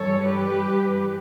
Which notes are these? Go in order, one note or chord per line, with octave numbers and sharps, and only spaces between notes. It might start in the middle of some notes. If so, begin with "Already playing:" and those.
Already playing: G2 E3 G3 A4 C#5
G4 B4